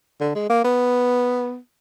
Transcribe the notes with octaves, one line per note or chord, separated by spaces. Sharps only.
D3
G#3
A#3
B3